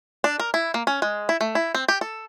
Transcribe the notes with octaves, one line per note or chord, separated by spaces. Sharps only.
D4
A#4
E4
A#3
C#4
G#3
E4
A3
E4
C4
G4
A4